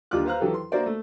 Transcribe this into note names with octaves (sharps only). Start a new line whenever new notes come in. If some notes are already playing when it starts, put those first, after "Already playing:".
D#2 D3 G3 F4 D6 F#6
B4 C5 F5 A#5 F#6
D#3 E3 F#3 G4 A4
C6
A#3 F#4 C5 D5 E5
A3